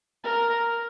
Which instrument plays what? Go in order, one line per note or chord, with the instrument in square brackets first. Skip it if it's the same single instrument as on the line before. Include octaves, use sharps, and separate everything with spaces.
[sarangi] A#4